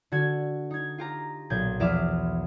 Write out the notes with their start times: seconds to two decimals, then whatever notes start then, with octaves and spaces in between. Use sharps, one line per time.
0.12 D3 F#4 G#6
0.71 D#4 G#6
0.98 F4 G4 A#5
1.50 B1 A#2 G6 G#6
1.80 E2 F3 E5 D6 F6